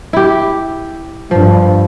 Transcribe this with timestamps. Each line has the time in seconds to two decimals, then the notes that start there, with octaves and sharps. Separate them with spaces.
0.13 E4 G4
1.31 G2 F3